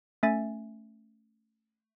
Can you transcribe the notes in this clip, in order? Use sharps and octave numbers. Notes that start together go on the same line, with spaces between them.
A3 C#4 E5 G#5 A6